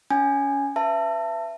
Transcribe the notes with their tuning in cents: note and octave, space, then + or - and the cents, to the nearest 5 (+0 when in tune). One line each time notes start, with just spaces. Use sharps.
C#4 +20 G#5 +0
B4 +10 E5 +25 A5 +20